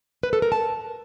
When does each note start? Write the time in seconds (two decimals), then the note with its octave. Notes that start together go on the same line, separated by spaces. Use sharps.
0.23 B4
0.33 A4
0.42 A#4
0.52 A5